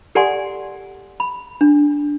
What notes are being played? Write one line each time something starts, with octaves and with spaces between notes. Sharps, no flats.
G4 A4 D5 F#5 G#5 C6
B5
D4